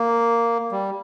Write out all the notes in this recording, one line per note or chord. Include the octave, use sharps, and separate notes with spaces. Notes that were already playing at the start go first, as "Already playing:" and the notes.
Already playing: A#3
G3